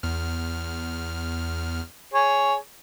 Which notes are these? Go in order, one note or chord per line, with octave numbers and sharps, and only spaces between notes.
E2 F6
G#4 C#5